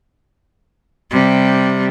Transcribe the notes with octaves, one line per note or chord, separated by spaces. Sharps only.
C3 G3